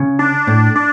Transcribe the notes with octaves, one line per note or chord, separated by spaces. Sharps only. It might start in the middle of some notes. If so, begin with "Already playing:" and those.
Already playing: C#3
D4
A2
D4